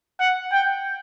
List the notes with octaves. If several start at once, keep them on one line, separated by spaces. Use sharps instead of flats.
F#5
G5